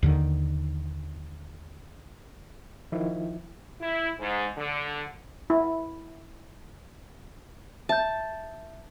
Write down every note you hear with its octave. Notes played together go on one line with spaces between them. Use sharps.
D#2 D3 D#3
D#3 F3 E4
E4
G#2
D3
E4
E5 A5 G6